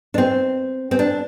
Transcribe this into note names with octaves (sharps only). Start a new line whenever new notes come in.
D4
C4
C4
D4